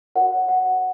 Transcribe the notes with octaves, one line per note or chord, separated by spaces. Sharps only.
F#4 A#4 C#5 F#5
F#5